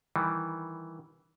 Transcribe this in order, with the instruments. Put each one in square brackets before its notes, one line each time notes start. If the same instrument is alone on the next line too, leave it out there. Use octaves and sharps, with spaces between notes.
[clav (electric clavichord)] D#3 E3 G3